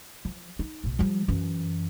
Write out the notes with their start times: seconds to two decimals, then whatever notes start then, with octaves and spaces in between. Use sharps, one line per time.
0.25 F3
0.59 D#4
0.84 B1 A2
0.99 F3 G3
1.28 F#2 E3